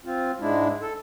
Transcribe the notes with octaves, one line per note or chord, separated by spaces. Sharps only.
C4 F4
G#2 G#3 D4 E4
A4